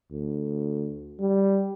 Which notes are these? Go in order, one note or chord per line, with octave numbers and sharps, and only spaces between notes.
D2
G3